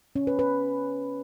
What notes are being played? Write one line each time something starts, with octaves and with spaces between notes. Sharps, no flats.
C#4
B4
B4